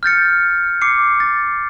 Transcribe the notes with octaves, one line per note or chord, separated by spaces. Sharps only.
F6 G6 A6 C#7
D6 C7 C#7
A6